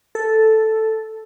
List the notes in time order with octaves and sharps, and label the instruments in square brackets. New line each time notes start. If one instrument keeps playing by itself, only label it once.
[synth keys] A4